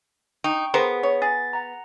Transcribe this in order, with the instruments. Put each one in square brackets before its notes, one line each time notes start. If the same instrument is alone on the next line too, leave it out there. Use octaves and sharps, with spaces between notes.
[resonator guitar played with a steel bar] D#4 [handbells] G5 C#6
[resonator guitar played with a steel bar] B3 [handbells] G#4 [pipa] A#4 C5
[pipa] C#5
[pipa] G#4 [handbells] A6
[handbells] F#5 A#5